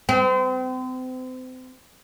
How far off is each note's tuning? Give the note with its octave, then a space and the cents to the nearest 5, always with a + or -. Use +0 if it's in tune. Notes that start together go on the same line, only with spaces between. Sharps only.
C4 -35